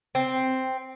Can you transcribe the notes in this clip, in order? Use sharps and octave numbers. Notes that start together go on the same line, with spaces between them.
C4